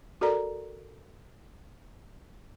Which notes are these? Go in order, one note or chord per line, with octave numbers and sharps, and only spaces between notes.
F#4 A4 A#4 D5 A#5